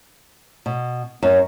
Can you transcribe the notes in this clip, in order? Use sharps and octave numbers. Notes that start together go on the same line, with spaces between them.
B2
F#2